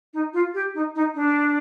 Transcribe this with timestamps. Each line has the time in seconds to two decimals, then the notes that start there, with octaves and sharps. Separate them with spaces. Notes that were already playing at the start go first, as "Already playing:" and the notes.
0.14 D#4
0.33 F4
0.54 G4
0.74 D#4
0.95 D#4
1.15 D4